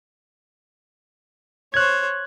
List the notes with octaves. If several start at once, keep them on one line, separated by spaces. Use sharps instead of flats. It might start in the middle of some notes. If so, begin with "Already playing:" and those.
C5 C#5 F#6 G#6